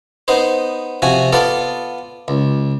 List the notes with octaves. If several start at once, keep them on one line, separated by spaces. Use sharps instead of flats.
B3 D#4 C5
C3 F3 F#4 G#5
B3 F4 A4 D5
C#2